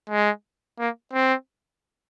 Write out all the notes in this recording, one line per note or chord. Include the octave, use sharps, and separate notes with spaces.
G#3
A#3
C4